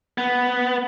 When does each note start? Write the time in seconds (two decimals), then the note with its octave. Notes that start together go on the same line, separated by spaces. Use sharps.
0.18 B3